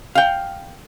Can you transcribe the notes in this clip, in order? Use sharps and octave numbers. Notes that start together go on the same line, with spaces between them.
F5 G5